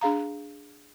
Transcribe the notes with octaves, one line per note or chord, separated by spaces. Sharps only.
D4 G#4 F5 A#5